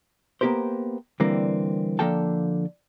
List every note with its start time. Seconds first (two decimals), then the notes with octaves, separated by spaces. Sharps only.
0.41 A#3 B3 D4 G4 A#4 C5
1.20 D3 E3 G3 A#3 C4
1.99 D3 F3 A#3 A4 G5 A5